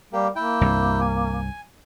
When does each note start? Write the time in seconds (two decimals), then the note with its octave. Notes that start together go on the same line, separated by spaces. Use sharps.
0.13 G3 A#3 G4
0.36 A#3 E4 G5
0.61 C2 G2
1.01 G#5